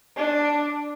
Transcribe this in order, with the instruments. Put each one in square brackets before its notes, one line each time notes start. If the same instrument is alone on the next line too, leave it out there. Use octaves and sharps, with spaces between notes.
[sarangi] D4